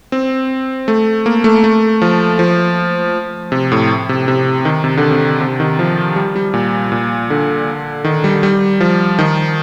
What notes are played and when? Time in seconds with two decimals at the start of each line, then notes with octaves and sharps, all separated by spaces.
0.12 C4
0.88 A3
1.26 A#3
1.44 A3
1.64 A3
2.02 F3
2.39 F3
3.52 C3
3.72 A2
4.09 C3
4.28 C3
4.65 D#3
4.84 C3
4.97 D3
5.11 C3
5.41 C3
5.60 D#3
5.79 F3
6.16 G3
6.36 G3
6.54 A#2
6.92 A#2
7.30 D3
8.04 D#3
8.24 G3
8.43 G3
8.81 F3
9.19 D#3